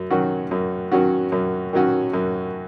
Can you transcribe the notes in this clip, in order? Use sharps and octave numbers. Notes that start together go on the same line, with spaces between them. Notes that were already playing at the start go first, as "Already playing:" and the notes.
Already playing: F#2
D#3 F#3 C#4 F#4
F#2
D#3 F#3 C#4 F#4
F#2
D#3 F#3 C#4 F#4
F#2